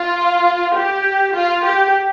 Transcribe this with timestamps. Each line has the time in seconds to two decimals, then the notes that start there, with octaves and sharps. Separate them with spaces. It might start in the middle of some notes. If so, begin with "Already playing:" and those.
Already playing: F4
0.75 G4
1.34 F4
1.64 G4